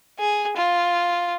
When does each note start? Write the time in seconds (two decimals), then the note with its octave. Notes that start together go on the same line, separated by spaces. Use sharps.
0.19 G#4
0.56 F4